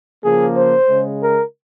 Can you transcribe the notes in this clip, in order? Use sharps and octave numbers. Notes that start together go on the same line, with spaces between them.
C#3 F3 A#3 G#4
C5
C#3 G#3
A#4